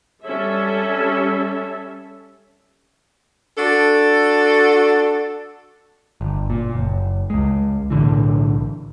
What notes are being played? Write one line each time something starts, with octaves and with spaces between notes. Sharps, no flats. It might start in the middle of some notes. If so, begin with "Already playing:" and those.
G3 C#4 A4 E5
D4 F#4 A4
G1
A#2
F#1
C#2 G#3
B1 A2 D3 E3